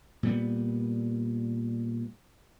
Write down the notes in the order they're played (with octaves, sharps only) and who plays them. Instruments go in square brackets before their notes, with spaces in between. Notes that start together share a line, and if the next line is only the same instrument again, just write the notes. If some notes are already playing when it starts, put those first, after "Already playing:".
[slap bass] A#2 G3 B3